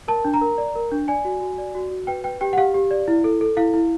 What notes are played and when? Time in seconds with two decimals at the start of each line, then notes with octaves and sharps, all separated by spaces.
0.08 A#4 A5
0.25 D4
0.34 A#5
0.41 A#4
0.58 D5
0.75 A#4
0.92 D4
1.08 D5 G#5
1.25 F#4
1.41 F#4
1.58 D5
1.75 F#4
1.91 F#4
2.07 B4 G5
2.24 B4 G5
2.41 G4 G5
2.53 F#5
2.57 G4 F5
2.74 G4
2.91 D5
3.08 E4
3.24 A4
3.41 A4
3.57 E4 F5
3.74 E4